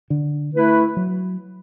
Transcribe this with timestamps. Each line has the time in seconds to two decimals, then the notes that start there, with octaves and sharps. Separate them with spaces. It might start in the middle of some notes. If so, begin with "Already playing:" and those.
0.10 D3
0.54 A3 E4 B4
0.97 F#3